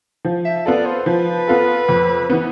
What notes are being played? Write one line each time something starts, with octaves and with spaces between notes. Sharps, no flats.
F3
E5
B3 F4 A4 D5
C5
F3 B4
B3 F4 A4
F2
E3 B3